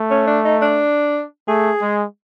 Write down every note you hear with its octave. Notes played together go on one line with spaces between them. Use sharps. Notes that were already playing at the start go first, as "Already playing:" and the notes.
Already playing: A3
C#4
D4
D#4
D4
A3 G#4
G#3